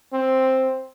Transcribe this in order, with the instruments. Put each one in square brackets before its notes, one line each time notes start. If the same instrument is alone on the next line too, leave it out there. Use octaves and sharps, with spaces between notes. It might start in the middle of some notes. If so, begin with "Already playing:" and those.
[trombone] C4